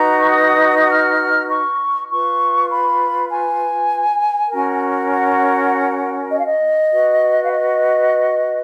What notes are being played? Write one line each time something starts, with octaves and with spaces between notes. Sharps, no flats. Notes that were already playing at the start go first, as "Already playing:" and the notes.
Already playing: D#4 F#4 B4 A#5
C#6
D#6
D#6
F6
C#6
F4 B4 C#6
B5
G#5
C#4 F#4 A#4
F#5
D#5
F5
D#5
F#4 B4
F5
D#5